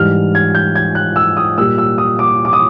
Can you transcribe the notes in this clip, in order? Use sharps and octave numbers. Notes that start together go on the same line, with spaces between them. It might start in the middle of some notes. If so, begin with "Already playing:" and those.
Already playing: G#2 E3 G3 F6
G#6
G6
G#6
F#6
E6
D#6
A#2 G3 A#3 E6
E6
D#6
D6
D6
D#6